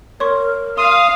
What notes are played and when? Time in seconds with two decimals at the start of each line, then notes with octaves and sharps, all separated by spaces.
0.20 A#4 C#5 C6 C#6
0.78 F5 C6 D#6